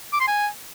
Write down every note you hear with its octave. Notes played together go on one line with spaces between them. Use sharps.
D6
C6
G#5